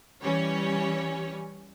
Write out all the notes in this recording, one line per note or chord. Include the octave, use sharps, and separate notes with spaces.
E3 G3 C#4 C#5